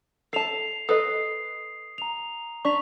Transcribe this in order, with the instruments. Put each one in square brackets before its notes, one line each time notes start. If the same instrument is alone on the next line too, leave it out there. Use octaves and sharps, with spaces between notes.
[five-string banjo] A4 A5 [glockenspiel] C7 F7
[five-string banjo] A4 B4 D#5 [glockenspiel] D#6 C7
[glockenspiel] A#5 F7
[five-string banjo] D4 [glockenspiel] C#6 B6 F7